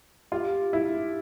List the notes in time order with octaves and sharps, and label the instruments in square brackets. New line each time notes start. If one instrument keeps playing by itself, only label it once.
[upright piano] F4 [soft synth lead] G4
[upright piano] E4